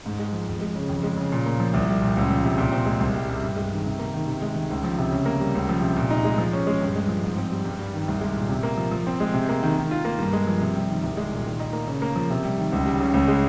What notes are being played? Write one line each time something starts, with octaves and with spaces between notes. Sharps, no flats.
G#2
G#3
F3
F2
G#3
C#3
F2
G#3
C#3
A#2
A#3
F3
C2
G3
A#2
C#2
F3
C3
A#2
C4
G#3
C2
G3
C3
G2
G#3
D#3
C3
A#3
D#3
C3
G#3
D#3
C#2
F3
C3
C#3
A#3
G3
C#2
F3
C3
A#2
D#4
G#3
F3
C#4
G#3
G2
G#3
F3
G#2
C4
G3
G2
G3
D#3
C2
G#3
A#2
C3
A#3
F3
F3
C4
G#3
C3
A#3
D#3
D#3
F4
A#3
G2
G#3
F3
C3
G3
D#3
C2
G#3
A#2
D#3
D#4
A#3
C#3
A#3
F3
C3
G3
D#3
C#2
G3
C#3
C#2
G#3